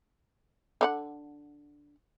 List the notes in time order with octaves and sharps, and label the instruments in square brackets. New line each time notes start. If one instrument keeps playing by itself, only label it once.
[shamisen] D3 D4 F#5